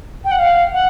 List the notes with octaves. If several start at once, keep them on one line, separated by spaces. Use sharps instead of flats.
G5
F#5
F5
F#5